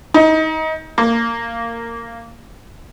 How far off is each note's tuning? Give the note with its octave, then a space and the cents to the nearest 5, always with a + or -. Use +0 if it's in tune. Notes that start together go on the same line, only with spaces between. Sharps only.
D#4 +25
A#3 -15